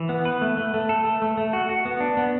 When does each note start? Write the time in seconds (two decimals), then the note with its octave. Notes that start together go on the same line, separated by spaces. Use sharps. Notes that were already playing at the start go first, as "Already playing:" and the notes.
Already playing: E3
0.09 B3
0.25 B4
0.42 A3
0.57 A3
0.74 A3
0.89 A4
1.05 A3
1.22 A3
1.37 A3
1.53 F#4
1.69 F#4
1.85 B3
2.00 D4
2.17 B3